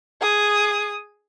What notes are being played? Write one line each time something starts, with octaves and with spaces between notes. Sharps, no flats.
G#4 D#6